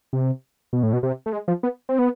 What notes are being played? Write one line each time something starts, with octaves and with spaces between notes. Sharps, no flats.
C3
B2
A2
B2
C3
A3
G#3
F3
B3
C4
B3